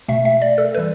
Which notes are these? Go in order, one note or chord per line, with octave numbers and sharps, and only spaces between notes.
B2 A3 E5
E5
D5
A4
E3 G3 B4